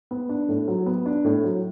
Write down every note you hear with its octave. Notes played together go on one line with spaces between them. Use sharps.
B3
D4
A2
F#3
B3
D4
A2
F#3